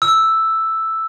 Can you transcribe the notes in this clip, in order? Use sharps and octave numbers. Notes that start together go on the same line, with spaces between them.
E6